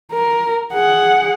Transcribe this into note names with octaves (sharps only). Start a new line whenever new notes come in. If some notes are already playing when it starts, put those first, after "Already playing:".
A#4
G#4 F#5